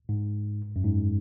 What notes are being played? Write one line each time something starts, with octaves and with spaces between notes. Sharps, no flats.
G#2
F#2
G#2